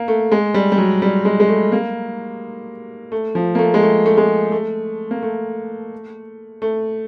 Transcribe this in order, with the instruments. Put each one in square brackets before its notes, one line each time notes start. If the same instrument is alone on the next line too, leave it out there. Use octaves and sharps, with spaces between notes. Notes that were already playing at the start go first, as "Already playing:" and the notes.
Already playing: [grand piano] A#3
A3
G#3
G3
G3
F#3
G3
G#3
G#3
A3
A#3
A3
F3
A#3
A3
G#3
A3
A3
G#3
A3
A#3
A3
A3